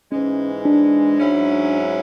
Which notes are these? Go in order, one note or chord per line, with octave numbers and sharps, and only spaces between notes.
G#2 E3 G#3 C#4
D4
G#2 F#3 C#4 E4